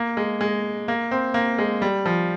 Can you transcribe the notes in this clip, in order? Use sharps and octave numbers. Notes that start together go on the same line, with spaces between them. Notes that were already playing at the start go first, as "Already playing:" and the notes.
Already playing: A#3
G#3
G#3
A#3
C4
A#3
G#3
G3
F3